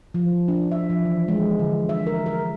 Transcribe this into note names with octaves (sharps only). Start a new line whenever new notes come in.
F3
D4
E5
F3
E3
G#3
D3
E5
A#4
A#4